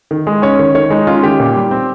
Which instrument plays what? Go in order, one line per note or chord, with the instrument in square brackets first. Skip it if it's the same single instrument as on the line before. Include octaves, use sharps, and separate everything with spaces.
[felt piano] D#3
G#3
C#4 C#5
D#3
D#3 C#5
G#3 D#4
C#4 F4
D#3 G4
A#2
G3
C4